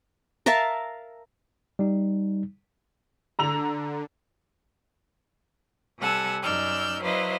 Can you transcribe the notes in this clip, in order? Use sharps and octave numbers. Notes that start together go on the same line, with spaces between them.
A#4 E5 F5 A5
G3 D#4
D3 A#5 E6 F7
C3 G3 A4 F#5 G#5 E6
F#2 D#4 D5 E6 F6 G6
F#3 E4 B4 C5 D#5 F5